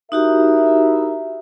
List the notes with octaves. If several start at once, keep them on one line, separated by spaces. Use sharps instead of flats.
D#4 E4 F#4 G4 A#4 E5